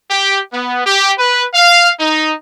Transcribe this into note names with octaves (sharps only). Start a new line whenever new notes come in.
G4
B3
G4
B4
F5
D#4